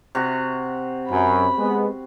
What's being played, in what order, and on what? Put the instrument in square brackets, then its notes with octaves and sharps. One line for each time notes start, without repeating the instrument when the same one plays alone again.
[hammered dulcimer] C3 F#4
[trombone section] F#2 [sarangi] B5
[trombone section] G#3 B3